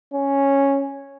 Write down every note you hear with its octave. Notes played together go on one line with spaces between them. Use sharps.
C#4